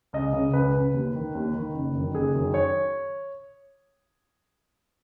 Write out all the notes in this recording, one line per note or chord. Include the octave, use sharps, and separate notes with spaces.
C#2 D#5
C#3
C#2 B4
C#3
D#2
D#3
D#2
D#3
F#1
F#2 D#3
F#1 G#4
F#2 D#3
C#5